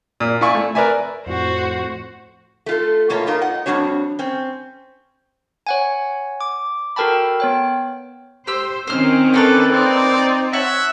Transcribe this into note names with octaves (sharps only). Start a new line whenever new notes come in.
A#2
E4 F4 D5 G#5 C#6
A3
A#4 B4 D5 E5 G#5
F2 A2 F#4 C5
A3 F4 A4
B2 A#3 F4 C#5 E5 A5
B3 D#4 F4 A#4
D#5 F#5
F2 A#2 G3 D4 F#4 C#5
C4 C#4
C#5 F#5 G#5
D6
F#4 A4 A#4 G5 A5 B5
B3 C#5 G5
G4 C5 E6
D#3 C4 C#4 C5 F6
A3 A#3 A4 B4
C4 D#4 D5
C#5 E5 F#5 A5